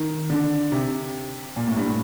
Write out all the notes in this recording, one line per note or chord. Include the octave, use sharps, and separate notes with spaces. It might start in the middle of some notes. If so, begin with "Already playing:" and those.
Already playing: D#3
D3
C3
A#2
A2
G2
A2